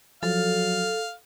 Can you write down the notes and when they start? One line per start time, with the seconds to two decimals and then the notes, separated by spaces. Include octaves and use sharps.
0.23 F3 F#3 A4 F5